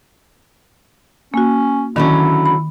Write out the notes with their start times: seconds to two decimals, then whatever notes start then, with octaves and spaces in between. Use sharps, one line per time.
1.34 A#3 C#4 F#4
1.96 D3 D#3 F#3 C#4 E4
2.46 B5